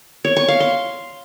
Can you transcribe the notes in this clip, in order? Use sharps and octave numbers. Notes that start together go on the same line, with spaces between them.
C#5
C#6
F5
C6